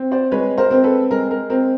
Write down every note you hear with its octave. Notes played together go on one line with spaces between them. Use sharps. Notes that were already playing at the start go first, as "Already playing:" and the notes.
Already playing: C4
C5 D5
G#3 B4 C#5
A#4 C5
C4
A4 B4
G#3 A#4
A#4
C4 A#4